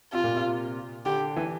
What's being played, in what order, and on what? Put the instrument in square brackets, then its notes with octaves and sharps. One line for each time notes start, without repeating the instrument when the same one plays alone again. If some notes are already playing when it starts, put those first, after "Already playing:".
[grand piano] C3 [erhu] F4
[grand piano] A#2
C3
[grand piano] D3 [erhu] G4
[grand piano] E3